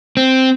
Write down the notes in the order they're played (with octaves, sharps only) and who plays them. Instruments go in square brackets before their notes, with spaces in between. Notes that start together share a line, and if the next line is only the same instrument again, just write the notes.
[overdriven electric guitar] C4